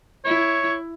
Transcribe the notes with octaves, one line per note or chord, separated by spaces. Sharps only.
E4 C#5